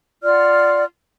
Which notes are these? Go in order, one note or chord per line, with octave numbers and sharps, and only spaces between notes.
F4 D5 F#5 F6